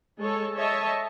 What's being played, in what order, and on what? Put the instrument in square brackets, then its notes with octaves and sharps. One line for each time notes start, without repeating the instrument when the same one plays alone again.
[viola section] G#3 G#4 A4 C#5
C#5 D#5 E5 A5